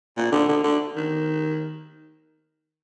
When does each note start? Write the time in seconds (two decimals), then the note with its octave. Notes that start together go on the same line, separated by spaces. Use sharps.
0.17 A#2
0.32 D3
0.49 D3
0.64 D3
0.96 D#3